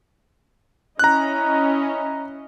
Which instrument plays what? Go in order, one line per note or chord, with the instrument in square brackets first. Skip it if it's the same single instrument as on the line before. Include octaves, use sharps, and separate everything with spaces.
[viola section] C#4 E4 D#5 [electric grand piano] A#5 F#6